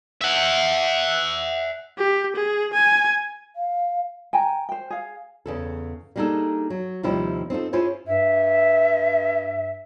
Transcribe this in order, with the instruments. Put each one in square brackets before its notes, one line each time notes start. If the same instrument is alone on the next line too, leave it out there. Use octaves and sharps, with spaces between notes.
[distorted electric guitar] E5 F#5
[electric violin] G4
G#4
G#5
[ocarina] F5
[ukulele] G5 G#5 A#5
C5 G5
G#4 F5
[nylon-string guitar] E2 C#3 A4
G3 A#3 D4 D#4 G#4 A4
F#3
D#2 C3 F3 G3 E4
C4 D#4 F4 A4
C#4 E4 F4 G#4 C5 C#5
[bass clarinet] G2 [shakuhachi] E5